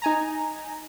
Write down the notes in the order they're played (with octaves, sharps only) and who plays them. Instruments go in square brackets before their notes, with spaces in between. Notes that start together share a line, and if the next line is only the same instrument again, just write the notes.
[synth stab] D#4 G#5 A#5